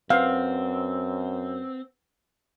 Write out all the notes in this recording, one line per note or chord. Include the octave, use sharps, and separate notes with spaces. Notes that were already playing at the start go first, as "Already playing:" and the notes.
F#2 C4 B4 F5 F#5